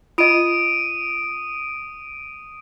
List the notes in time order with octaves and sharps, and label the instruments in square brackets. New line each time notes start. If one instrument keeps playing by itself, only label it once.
[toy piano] F4 D#5 [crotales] D#6 D7 D#7